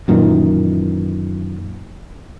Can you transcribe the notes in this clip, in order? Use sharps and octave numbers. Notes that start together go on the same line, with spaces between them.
F#2 A#2 D#3 E3